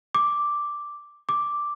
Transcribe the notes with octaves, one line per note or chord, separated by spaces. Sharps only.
D6
D6